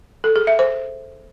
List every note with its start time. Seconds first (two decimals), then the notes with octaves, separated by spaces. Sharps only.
0.24 A4
0.36 G#4
0.47 E5
0.59 C5